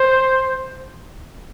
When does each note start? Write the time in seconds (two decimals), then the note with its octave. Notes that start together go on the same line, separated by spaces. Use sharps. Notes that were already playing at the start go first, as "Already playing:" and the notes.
Already playing: C5